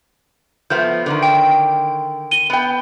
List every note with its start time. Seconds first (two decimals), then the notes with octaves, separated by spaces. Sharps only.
0.70 F3 A3 B3 G6
1.06 D3 D#3
1.23 G5
2.31 D#7 G7
2.50 B3 G5